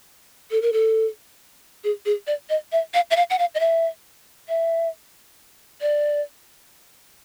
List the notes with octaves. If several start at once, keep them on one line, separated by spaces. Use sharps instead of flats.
A4
A#4
A4
G#4
G#4
D5
D#5
E5
F5
E5
F5
F#5
F5
D#5
E5
E5
D5